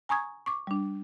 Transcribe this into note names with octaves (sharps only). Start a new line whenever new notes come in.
G#5 A#5 C#6 D#6 G#6
C#6 D6
G3 D4